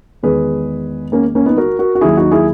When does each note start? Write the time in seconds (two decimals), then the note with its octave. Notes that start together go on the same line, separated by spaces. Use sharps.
0.23 E2 D#3 G#3 G#4 B4
1.12 A#3 C#4
1.35 A#3 C#4
1.46 B3 D#4
1.57 F#4 A#4
1.79 F#4 A#4
1.95 F#4
2.01 D#2 D#3 F#3 E4 G#4
2.17 D#4 F#4
2.31 E4 G#4